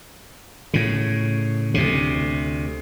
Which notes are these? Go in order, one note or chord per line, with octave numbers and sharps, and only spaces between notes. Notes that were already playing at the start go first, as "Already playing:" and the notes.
A2 C#3
D2 C3